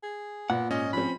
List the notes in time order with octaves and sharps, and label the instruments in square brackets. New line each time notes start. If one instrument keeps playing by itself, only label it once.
[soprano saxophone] G#4
[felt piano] A#2 [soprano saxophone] B3 [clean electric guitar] F#5
[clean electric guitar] G#2 [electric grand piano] C#4 [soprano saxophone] D#5
[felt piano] F3 C4 [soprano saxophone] B5